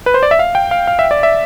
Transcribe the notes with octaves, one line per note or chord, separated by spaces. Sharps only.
B4
C5
D5
E5
F5
G5
F5
F5
E5
D5
E5